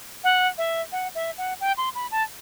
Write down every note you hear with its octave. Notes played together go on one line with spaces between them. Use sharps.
F#5
E5
F#5
E5
F#5
G5
C6
B5
A5